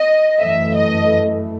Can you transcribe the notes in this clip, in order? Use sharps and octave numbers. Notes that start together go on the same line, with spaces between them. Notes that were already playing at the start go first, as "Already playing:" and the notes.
Already playing: D#5
F#2 E3 A3 E5
D#5